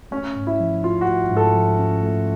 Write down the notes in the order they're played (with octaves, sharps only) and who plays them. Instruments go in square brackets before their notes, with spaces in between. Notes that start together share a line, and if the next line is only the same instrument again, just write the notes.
[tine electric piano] A3 [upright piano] C#4
[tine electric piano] G#2
[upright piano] E4
[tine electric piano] F3
[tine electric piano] C#4 [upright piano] F4
[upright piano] F#4
[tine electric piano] A3
G#2
[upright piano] A4
[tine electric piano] F3
C#4
A3